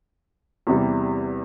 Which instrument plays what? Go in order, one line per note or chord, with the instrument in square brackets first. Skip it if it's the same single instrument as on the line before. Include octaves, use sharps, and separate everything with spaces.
[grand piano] E2 C3 G3